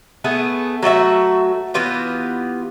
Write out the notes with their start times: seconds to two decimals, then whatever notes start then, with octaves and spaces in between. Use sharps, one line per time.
0.24 A3 B3 G#4
0.83 F#3 A3 F#4 E5
1.74 E3 B3 F4 G4